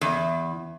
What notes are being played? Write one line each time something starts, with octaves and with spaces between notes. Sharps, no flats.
E2